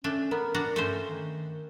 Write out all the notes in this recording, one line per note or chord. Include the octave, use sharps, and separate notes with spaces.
A3 C#4 D4
B3 A#4
D4 F#4 A#5
G2 A3 C#4 C5
D#3